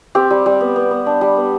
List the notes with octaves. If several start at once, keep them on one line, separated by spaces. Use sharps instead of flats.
C4 G4
G3
G3
B3
B3
B3
D4
G3
B3